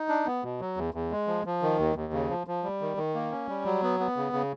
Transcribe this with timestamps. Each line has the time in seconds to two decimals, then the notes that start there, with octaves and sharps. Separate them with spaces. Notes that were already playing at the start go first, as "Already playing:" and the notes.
Already playing: D#4
0.09 D4
0.26 B3
0.43 B2
0.61 F#3
0.77 E2
0.94 E2
1.11 G#3
1.27 F3
1.46 F3
1.62 D#3
1.78 D#2
1.96 D#2
2.13 C#3
2.30 F3
2.47 F3
2.63 G3
2.81 D#3
2.97 D#3
3.15 A#3
3.32 C#4
3.49 G3
3.65 F#3
3.83 B3
4.00 B3
4.17 C#3
4.33 C#3